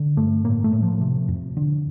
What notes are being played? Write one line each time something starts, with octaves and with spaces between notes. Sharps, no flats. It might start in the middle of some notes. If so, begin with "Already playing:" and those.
Already playing: D3
G2 A3
A2 A#3
A3
A2
F3
C3
F2
D3